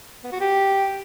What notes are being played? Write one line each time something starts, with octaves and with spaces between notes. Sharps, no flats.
B3
F#4
G4